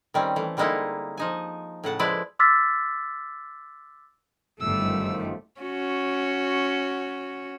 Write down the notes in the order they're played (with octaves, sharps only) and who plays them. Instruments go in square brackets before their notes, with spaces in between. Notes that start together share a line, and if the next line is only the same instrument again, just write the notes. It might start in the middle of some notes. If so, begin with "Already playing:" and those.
[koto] D#3 G3 C4 C#4
E3 A3
D3 G3 G#3 A#3 D#4 E4
F3 D#4 G#5
A2 C#3 F#5 A5
F3 G#3 E4 B4 D5
[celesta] C6 D6 E6 F6 A6 B6
[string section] G1 [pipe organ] F#2 D#3 F3 [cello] G3 A3 [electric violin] E6
[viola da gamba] C#4 F#4